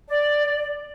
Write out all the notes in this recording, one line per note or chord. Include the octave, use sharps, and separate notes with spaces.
D5